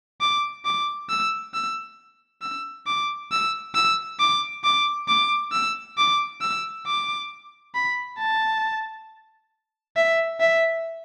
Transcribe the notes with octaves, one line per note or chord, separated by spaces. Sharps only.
D6
D6
E6
E6
E6
D6
E6
E6
D6
D6
D6
E6
D6
E6
D6
B5
A5
E5
E5